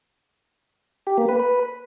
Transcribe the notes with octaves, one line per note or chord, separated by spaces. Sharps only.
G4
A#3
B4
B4